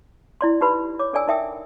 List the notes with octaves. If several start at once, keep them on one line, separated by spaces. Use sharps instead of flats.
E4 D5 C6
D#4 G4 B4 B5
C#5 D6
D4 A4 D5 G#5 E6
D#4 A#4 E5 G5 D#6